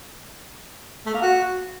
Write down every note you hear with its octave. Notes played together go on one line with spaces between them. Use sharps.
A3
A#3
F#4